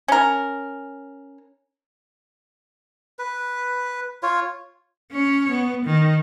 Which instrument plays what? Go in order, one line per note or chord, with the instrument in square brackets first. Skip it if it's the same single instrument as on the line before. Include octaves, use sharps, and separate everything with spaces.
[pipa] C#4 A#4
[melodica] B4
F4 C#5
[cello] C#4 C#5
B3
D#3